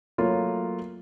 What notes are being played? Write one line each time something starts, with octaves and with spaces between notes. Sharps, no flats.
F#3 A3 A#3 F4